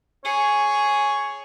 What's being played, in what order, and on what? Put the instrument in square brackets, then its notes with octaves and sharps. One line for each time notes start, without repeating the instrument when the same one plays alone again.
[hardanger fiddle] G#4 [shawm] C#5